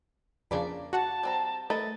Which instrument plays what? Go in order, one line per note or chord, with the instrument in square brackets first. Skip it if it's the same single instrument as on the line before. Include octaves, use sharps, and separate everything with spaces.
[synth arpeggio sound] F2 C#3 D4 [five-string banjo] A#3 D5 B5
[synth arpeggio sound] F#4 F#5 [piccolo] A5
[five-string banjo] G3 C4 A#5
[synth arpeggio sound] A3 [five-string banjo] A#4 B4 D#5 [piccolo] A6